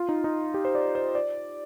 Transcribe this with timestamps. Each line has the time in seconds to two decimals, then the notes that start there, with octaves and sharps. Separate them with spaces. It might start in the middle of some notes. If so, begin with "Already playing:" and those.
Already playing: F4
0.09 D#4
0.24 D#4
0.54 G4
0.65 C5
0.75 D5
0.95 C5
1.15 D5